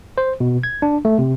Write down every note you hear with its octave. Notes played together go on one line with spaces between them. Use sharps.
C5
B2
G#6
D4
A3
C3